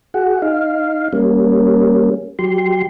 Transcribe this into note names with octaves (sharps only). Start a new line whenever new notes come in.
F#4 G#4 F#5
D#4 F5
G3 A#3 C#4
F#3 G4 C6